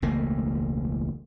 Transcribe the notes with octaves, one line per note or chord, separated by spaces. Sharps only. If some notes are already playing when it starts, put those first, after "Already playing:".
E1 C#2 A3 A#3